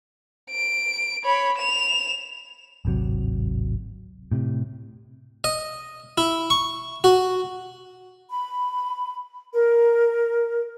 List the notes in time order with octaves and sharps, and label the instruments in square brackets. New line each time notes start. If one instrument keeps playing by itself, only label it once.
[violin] D7
C#5 B5
E7 F7
[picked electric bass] D1 G#1 C3 F#3
A2 C3
[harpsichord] D#5
E4
C#6
F#4
[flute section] B5
A#4